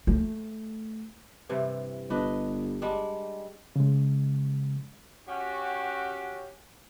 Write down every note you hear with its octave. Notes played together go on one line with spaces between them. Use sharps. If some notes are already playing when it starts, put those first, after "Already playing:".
A3
G2 C3 E3
G1 D4 B4 D#5
G3 G#3 D4
C#3 G#3
C#4 F#4 G4